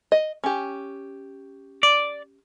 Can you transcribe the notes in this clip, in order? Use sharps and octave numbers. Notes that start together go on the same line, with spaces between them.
D#5
C#4 G4
D5